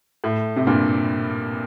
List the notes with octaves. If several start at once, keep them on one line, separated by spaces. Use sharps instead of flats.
A2
C3
G2 A#2